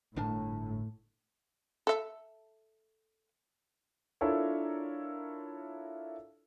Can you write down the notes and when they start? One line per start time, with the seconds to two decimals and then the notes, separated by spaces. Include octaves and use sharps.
0.16 G1 F2 A2 D4 A#4 A5
1.87 A4 E5
4.21 D4 E4 F4 A4 A#4 C#5